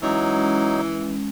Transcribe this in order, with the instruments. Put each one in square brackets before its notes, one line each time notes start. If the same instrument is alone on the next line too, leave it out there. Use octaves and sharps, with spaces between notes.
[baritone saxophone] E3 [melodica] F#3 D#4 [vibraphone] G#3 C#4